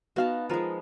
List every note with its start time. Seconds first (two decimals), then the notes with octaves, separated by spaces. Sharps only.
0.16 B3 D#4 F#4 F5 A5
0.49 F3 G#3 F4 A#4